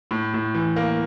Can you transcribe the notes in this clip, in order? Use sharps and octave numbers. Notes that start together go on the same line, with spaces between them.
A2
A2
E3
A#3